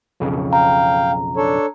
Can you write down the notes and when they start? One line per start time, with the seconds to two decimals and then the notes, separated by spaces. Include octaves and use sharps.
0.20 B1 F2 C#3
0.53 F5 G5 A#5
1.37 D4 A4 C#5